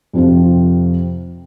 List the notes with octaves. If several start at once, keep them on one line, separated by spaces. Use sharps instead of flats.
F2 C3 F3 C4 F4